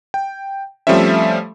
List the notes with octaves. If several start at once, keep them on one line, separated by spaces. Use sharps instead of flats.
G5
F3 G3 A3 C4 C#4 E5